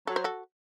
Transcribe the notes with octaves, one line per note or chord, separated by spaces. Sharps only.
F#3 A4
C5
F#4 A4